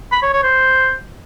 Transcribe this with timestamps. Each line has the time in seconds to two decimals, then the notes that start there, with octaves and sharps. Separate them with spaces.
0.12 B5
0.22 C#5
0.33 C#5
0.43 C5